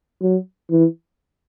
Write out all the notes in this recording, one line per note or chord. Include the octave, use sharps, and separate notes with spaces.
F#3
E3